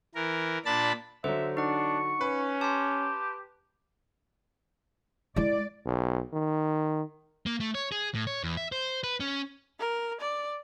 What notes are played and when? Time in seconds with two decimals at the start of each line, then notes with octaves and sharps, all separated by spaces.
0.15 E3 A#4
0.65 A#2 D4 A5 B5 A6
1.24 D3 F#3 C5 E5
1.57 D4 D#4 F#5 C#6
2.21 C#4 B4
2.61 G4 A5 A#5 C6
5.36 G#3 E4 D5
5.86 B1
6.33 D#3
7.46 A#3
7.60 A3
7.75 C#5
7.92 G#4
8.15 A2
8.27 C#5
8.43 E2
8.57 E5
8.72 C5
9.04 B4
9.20 C#4
9.80 A#4
10.21 D5